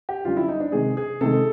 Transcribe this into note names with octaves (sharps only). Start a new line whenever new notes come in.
G4
F#2 D3 G3 F4
E4
D#4
D4
C3 D#3 G#3 G#4
G#4
C3 D#3 G#3 A4